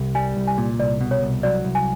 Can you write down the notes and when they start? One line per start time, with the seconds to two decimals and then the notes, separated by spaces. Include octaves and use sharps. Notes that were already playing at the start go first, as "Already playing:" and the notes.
Already playing: C2
0.15 G3 G#5
0.37 C2
0.47 G#5
0.58 A#2
0.79 C2 D5
1.01 B2
1.11 C#5
1.22 C2
1.43 F#3 D5
1.65 C2
1.75 G#5